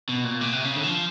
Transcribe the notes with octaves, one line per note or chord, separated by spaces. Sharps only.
B2
A#2
B2
C3
C#3
D3
E3
F3